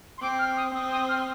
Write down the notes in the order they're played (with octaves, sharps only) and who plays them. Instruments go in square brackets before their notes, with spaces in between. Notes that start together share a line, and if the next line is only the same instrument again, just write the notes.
[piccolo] C6
[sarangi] C4 [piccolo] D6
[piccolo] F6
D#6
[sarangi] C4 [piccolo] D#6
[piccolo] D#6
F6